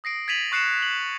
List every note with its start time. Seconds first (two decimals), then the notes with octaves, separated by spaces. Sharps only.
0.04 D#6 A#6 C7 D7
0.28 G#6 A6 B6 D#7 F7 F#7
0.52 C#6 F#6 C7 C#7 E7
0.82 F#7